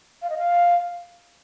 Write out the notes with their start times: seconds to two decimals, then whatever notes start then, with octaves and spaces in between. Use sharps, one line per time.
0.22 F5
0.29 D#5
0.37 F5